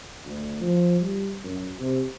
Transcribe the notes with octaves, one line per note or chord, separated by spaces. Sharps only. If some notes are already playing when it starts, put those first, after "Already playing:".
D2
F3
G3
F#2
C3